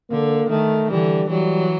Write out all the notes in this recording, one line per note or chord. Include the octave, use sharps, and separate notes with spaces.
D3 A#3
D#3 A3
D3 E3 G3
E3 F#3 G3